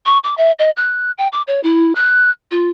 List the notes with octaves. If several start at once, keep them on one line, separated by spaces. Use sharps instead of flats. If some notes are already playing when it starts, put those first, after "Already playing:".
C#6
D6
E5
D#5
F#6
G5
D6
C#5
E4
F#6
F4